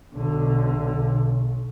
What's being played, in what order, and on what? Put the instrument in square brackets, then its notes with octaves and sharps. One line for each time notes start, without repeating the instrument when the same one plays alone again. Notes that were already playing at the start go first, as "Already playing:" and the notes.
[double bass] B1 [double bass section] B2 D3